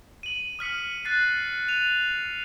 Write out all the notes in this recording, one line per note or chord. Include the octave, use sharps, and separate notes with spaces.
D#7 F#7
D#6 F6 B6 C#7
F#6 A6 C7
D#7 F7